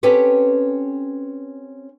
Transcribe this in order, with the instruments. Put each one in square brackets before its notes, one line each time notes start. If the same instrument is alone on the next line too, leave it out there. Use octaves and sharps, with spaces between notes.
[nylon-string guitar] C4 C#4 G4 A4 B4 C#5